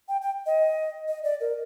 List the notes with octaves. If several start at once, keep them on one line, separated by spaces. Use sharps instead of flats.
G5
G5
D#5
D#5
D5
A#4